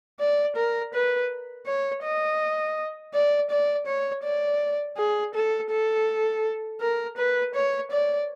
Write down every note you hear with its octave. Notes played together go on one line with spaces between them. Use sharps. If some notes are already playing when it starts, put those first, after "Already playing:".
D5
A#4
B4
C#5
D#5
D5
D5
C#5
D5
G#4
A4
A4
A#4
B4
C#5
D5